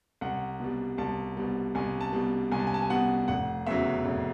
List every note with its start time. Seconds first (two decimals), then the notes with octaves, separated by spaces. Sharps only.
0.21 C2 F#5
0.60 B2 G3
0.98 C2 A5
1.37 B2 G3
1.75 C2 G#5
2.01 A5
2.13 B2 G3
2.52 C2 G#5
2.59 A5
2.67 G#5
2.74 A5
2.82 G#5
2.90 B2 G3 F#5
3.28 F1 F#5
3.67 E2 C#3 F#3 E5
4.05 F1